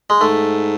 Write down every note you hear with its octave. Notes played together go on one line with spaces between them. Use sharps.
G#3
G#2 A3